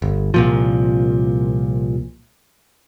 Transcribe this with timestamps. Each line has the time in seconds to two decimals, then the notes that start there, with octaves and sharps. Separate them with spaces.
0.02 G1
0.34 C2 A#2 F3